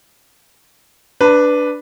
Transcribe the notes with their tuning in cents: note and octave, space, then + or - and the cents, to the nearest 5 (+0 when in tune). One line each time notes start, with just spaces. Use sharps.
D4 +0 B4 +0 A5 +45